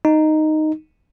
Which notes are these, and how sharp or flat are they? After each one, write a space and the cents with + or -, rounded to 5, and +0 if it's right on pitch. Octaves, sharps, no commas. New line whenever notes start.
D#4 -5